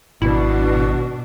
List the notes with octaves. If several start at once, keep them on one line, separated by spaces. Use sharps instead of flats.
G#1 B2 D4 E4 F#4